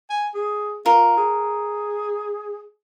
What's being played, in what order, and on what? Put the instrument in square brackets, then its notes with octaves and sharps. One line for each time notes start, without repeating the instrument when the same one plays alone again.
[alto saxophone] G#5
G#4
[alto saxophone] F4 [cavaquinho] A#4
[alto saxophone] G#4